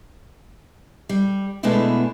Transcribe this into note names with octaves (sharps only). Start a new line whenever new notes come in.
G3
B2 G#3 A3 B3 D4 E4